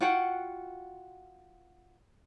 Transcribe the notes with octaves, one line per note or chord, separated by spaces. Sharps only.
F4 F#4 F#5 G5